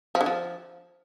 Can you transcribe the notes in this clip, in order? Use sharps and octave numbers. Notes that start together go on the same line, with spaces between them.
F3
D3
F3